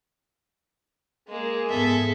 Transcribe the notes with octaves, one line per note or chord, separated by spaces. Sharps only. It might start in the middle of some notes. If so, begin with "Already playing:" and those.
G#3 A#3 G#4
G#2 B3 A4 E5